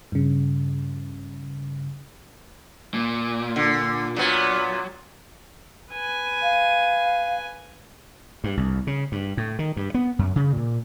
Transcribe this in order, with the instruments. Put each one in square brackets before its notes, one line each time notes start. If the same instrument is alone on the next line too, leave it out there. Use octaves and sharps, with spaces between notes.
[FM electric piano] G2 C#3
[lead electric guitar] A#2
[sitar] D3
[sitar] A#2 B3 [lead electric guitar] F#3
[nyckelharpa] B4 G#5
[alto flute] F5
[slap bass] G2
C2
C#3
G2
A2
D#3
G2
B3
F#2
C#3
A#2